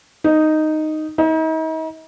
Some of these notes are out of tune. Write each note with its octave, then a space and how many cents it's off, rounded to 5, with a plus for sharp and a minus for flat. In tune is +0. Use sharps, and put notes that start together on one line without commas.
D#4 -5
D#4 +40